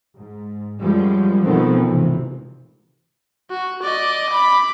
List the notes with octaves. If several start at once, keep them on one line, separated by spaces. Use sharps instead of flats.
G#2
F#2 F3 G3 G#3
B2 D#3 F3 A3 B3 C4
G#1 C3 E3
F#4
D5 D#5
B5 D6